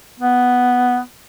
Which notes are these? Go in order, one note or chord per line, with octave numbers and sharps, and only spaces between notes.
B3